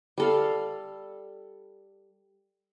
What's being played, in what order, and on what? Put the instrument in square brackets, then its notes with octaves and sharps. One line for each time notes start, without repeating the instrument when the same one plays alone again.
[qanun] G3 A4 F5